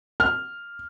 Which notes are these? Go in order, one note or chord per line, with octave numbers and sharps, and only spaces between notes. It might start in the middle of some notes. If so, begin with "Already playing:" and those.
F6